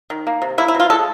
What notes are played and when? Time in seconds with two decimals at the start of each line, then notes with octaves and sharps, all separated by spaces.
0.10 D#3
0.27 A#3
0.42 C3
0.58 A#3 E4
0.68 E4
0.75 B2 F4
0.90 G#3 A4